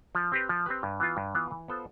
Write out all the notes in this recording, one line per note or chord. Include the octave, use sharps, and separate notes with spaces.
F3
C4 G4 B4
F3
C4 G4 B4
G2
E3 B3 F4
G2
E3 B3 F4
E3
B3 F4 A4 C5